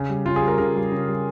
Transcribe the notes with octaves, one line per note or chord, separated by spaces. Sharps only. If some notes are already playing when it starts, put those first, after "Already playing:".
Already playing: C#3
G3
C#3 F4
G#4
G3
A#4
C#3 A#4
G3
C#3
G3